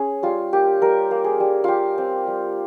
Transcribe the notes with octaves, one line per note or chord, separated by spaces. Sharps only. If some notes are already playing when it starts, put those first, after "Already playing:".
Already playing: C#4 G#4
G3 F4
A#3 G4
G3 A#4
A#3
G#4
G3
G3 F4 G4
C4
G3